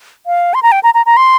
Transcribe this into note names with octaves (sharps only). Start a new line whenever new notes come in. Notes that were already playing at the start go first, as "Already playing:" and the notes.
F5
C6
A#5
G5
A#5
A#5
A#5
C6